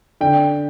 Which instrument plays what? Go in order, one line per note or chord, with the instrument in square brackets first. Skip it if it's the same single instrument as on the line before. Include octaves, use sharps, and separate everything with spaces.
[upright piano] D3 G5